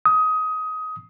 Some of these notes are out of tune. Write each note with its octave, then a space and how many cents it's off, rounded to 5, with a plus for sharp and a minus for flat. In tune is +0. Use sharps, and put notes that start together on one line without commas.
D#6 +20